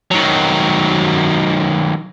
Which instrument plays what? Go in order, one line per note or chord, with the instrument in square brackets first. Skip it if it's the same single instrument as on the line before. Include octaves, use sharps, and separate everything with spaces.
[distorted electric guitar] D#3 F#3